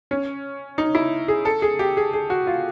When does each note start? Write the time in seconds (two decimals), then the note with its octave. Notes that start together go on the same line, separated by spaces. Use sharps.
0.11 C#4
0.78 D#4
0.95 E4
1.28 G#4
1.45 A4
1.62 G#4
1.79 G4
1.97 G#4
2.13 G#4
2.30 F#4
2.47 F4